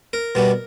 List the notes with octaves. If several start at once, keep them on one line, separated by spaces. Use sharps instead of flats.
A#4
B2 G3 B3